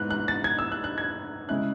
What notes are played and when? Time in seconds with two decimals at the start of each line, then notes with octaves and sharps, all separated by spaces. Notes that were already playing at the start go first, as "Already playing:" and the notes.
Already playing: G#2 B3 F#6
0.11 F#6
0.28 A6
0.44 G#6
0.59 E6
0.72 F#6
0.84 F#6
0.98 G#6
1.49 C#3 G#3 C#4 E4 F#6